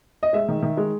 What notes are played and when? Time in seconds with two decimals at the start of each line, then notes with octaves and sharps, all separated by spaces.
0.23 D#5
0.33 G#3 E5
0.49 D#3
0.63 D#3
0.77 G#3